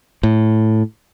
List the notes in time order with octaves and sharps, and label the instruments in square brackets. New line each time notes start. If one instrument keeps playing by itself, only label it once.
[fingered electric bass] A2